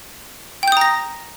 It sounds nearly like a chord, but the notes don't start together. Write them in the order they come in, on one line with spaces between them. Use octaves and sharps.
G5 G6 D#6 A#5 A#6